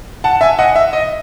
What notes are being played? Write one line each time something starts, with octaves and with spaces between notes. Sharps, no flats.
F#5 A5
E5 G#5
D#5 F#5
E5
D#5